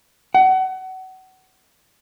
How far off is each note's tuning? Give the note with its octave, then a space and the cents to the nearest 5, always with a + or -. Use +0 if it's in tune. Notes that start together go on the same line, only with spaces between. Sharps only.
F#5 +30